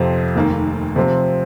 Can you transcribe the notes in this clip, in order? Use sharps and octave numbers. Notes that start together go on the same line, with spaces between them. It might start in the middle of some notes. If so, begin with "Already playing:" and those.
Already playing: F2 C3 F3 C4
F1 D#2 D#3 A#3
C3 F3 C4